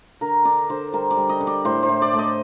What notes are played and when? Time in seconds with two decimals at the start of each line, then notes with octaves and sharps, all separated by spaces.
0.21 D3 A#4
0.45 D3 D5
0.70 D3 C5
0.93 G3 A#4
1.11 D5
1.17 G3
1.29 D#5
1.41 D3
1.47 D5
1.65 A2 C5
1.83 C5
1.89 A2
2.02 D5
2.13 A3
2.19 D#5